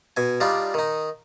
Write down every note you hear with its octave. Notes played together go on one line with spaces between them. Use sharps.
B2 G#5
G3 D4 D#4 F4
D#3 D#4